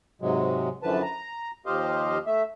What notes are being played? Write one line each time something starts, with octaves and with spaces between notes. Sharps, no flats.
G#2 C3 F#3 G#3
F#2 D3 E3 F3 B4 A5
A#5
D#2 F3 G4 C5 D#5 F5
A3 E5